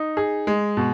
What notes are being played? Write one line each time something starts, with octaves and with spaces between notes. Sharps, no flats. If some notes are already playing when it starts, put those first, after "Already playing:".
Already playing: D#4
G#4
G#3
B2